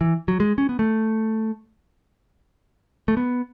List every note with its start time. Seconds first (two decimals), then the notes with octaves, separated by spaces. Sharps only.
0.01 E3
0.28 F#3
0.40 G#3
0.58 C#4
0.69 B3
0.79 A3
3.08 A3
3.17 B3